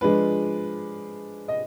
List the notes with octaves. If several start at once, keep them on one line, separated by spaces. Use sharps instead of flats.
F3 G#3 D4 F4 B4
D#5